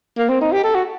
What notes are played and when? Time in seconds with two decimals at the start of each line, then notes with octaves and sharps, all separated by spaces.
0.17 A#3
0.28 C4
0.41 D#4
0.52 G4
0.64 A4
0.74 F#4